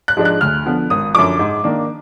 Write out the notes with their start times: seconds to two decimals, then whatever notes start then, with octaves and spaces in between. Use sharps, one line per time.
0.08 F#6
0.17 G#2 F3 G#3 D4
0.25 F#6
0.41 D2 F6
0.65 D3 F3 B3
0.90 G#1 D#6
1.15 F#2 D3 F3 D6
1.39 G#2
1.64 D#3 A#3 D4